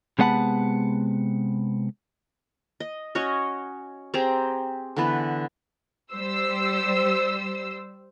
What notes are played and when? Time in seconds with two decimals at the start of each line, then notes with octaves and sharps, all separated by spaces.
0.19 C3 G#3 B3 F#5 A5 B5
2.80 D#5
3.15 C#4 F#4 C#5 D#5
4.14 C4 G4 G#4 A#5
4.96 D3 E3 B3 B4
6.13 G3 C5 E6